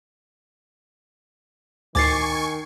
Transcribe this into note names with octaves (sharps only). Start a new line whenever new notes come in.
D2 A2 D#3 G#5 C#6 D6 A6 C7